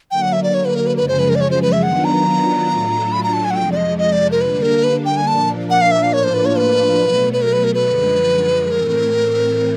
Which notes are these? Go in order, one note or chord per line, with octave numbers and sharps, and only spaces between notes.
D3 F#3 A#3 G5
F#5
E5
D5
C#5
B4
A#4
B4
F#2 C#3 F3 G#3 B4
C5
B4
A#4
D5
C#5
C5
B4
E5
D#3 F#3 B3 D4 F4 F#5
A#5
A2 F#3 A3 D4 F4
B5
A#5
A5
G#5
F#5
F2 C3 F3 G#3 G5
D5
D#5
D#5
D5
A#4
D3 G3 A#3 D4 B4
A#4
B4
G5
G#5
A#2 F3 A#3 D4 A5
F#5
F5
E5
F5
A2 F3 A#3 D4 F4 C#5
C5
B4
C#5
B4
B2 F#3 A3
B4
A#4
B4
A#4
B4
F#2 D3 F3 G#3
A2 E3 A3 C4 A#4